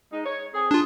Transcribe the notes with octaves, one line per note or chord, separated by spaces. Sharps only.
G#3 D#4
C#5
C4 G#4
D4 F4